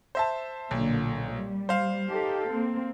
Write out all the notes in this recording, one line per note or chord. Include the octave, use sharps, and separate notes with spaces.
C5 E5 A5
B1 A#2 D3
G3
C5 F5
D#4 G4 A4
A#3 C4